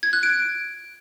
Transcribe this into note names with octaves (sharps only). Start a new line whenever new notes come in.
G#6
F#6
D7